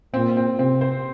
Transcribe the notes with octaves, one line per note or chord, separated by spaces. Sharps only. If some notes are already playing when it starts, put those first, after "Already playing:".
A#2 C4
C4
C3 C4
C5